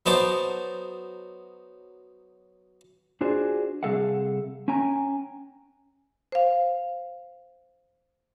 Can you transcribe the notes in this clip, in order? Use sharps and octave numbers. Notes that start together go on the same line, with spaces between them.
F#3 B3 D#4 C5 A5 D6
D4 F4 F#4 G#4 C5 D5
C3 G3 G#4 A4 F5 F#5
C#4 G5 G#5 A#5
C5 F5